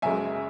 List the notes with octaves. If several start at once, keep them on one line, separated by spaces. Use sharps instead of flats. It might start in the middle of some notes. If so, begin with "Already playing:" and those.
F#1 F#2 C#3 G#3 E5 G#5